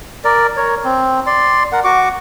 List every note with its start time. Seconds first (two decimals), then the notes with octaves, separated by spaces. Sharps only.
0.24 A#4 D5
0.57 A#4 C#5
0.84 C4
1.27 D5 C6
1.72 A#4 F#5
1.84 F#4 C#6 D6